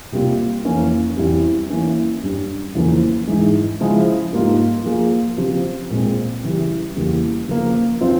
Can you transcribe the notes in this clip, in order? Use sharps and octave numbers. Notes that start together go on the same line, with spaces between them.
C3 G3 A#3 F4
F2 E3 A#3 C#4
E2 E3 G3 C4
E3 A#3 C#4
G2 G3 C#4
E2 C#3 F3 A#3 C#4
G#2 E3 G#3
C#3 F3 G#3 E4
G#2 G3 A#3 F4
F3 A#3 F4 G#4
C#3 F3 C4 G4
A#2 G#3 C4
C#3 E3 G3
E2 C#3 G3 A#3
C#3 F3 A#3
F3 C4 F4